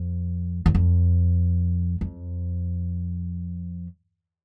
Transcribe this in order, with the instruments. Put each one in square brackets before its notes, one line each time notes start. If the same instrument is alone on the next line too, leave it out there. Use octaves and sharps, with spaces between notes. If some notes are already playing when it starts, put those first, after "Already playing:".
Already playing: [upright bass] F2
E2
F2
F2